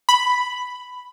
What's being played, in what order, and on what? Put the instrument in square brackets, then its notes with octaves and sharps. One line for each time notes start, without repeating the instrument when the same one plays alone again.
[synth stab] B5